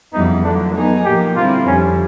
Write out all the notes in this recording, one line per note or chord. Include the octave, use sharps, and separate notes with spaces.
F2 C#3 E3 G3 B3 D#4
D3 F#3 A3 D4
F#3 B3 D#4 G#4
A#2 F3 A#3 G4
D3 G3 C4 E4 F4
F2 D3 G3 C#4